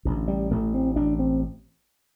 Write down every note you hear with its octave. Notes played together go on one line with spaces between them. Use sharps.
A1 D3
G3
A1 A3
C4
A1 D4
C4